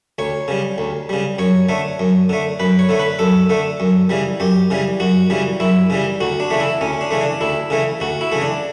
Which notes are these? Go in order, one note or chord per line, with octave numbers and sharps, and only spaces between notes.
D2 C#5
C#3 G3
D2
C#3 G3
F#2 C#5
D3 A3
F#2
D3 A3
F#2 B4
C#5
D3 A3
B4
F#2 A4
D3 A3
F#2
C#3 E3 G3
F#2 G4
C#3 E3 G3
F#2 F#4
C#3 E3 G3
F#2 E4
C#3 E3 G3
D2 F#4
D4
C#3 E3 A3
E4
D2 C#4
D4
C#3 E3 A3
D4
D2 E4
C#3 E3 A3
D2 F#4
E4
C#3 E3 A3
D4